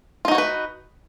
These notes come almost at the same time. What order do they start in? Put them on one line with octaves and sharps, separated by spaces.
F4 D#4 F#4 C#5 B4